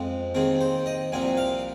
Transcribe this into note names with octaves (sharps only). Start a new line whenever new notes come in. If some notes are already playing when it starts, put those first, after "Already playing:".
Already playing: F2 F3 G#3 C4
D#2 D#3 C4 G#4
C5
D#5
C2 A#2 F3 C4 G#5
F5